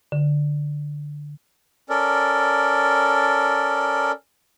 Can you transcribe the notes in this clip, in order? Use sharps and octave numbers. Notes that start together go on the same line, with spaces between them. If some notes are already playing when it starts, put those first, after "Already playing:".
D3
C#4 A4 A#4 D5